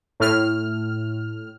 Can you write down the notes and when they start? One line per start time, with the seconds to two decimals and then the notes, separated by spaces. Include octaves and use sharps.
0.20 A2 F6